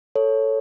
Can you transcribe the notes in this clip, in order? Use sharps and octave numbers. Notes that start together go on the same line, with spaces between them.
A4 C#5